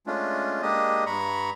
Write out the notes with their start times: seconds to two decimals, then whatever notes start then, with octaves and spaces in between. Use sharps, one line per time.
0.07 G#3 A3 C#4 D4 F4
0.62 G#3 A#3 D4 G4 D#5
1.06 G2 A#5 B5 C#6